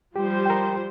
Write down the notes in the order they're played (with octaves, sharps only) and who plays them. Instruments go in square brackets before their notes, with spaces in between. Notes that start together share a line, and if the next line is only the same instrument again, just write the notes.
[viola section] F3 G3 C5 [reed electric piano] G4
[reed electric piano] A#4 G5